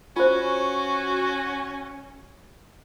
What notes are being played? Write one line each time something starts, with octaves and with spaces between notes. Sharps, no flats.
C#4 F4 F#4 C5